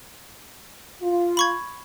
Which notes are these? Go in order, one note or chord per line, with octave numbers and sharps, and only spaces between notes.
F4
B5 C#6 G#6